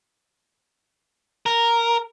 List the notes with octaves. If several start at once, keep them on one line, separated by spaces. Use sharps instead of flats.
A#4